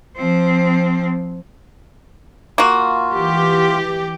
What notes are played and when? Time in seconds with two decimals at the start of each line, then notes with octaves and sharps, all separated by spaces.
0.17 F3 C4
2.58 A#3 F4 F#4
3.14 E3 G4